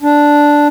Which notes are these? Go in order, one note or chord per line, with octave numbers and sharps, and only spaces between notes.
D4